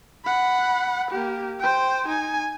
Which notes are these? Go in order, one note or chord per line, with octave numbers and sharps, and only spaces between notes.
F#5 B5
A#3 G4
C5 G5
D#4 G#5